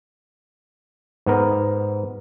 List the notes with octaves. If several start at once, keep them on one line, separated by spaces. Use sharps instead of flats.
G#2 B3 A#4